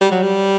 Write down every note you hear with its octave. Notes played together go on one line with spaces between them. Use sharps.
G3
F#3
G3